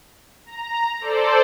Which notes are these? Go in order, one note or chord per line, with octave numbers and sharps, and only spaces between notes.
A#5
A4 C5 D5